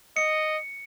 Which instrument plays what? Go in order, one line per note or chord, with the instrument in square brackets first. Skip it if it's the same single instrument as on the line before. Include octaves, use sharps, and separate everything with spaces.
[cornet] D#5 [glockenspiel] C#7